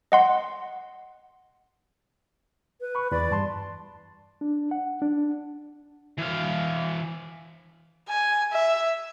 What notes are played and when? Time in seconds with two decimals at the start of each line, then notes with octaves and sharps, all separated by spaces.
0.12 D#5 F#5 C6
2.81 B4
2.95 B5 C#6
3.11 E2 E3 D5 B5
3.31 G2 A5 C6
4.41 D4
4.71 F#5
5.02 D4
6.18 E3 F5
8.08 G#5
8.52 E5